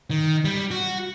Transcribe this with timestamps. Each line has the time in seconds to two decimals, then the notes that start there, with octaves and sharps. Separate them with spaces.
0.10 D#3
0.45 G3
0.71 F#4